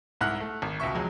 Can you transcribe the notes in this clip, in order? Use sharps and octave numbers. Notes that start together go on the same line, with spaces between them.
C2 G#2 E4 F#5 F6 F#6
A3
G#1
C#2 B2 E5 C#6
F2 F#3 G#3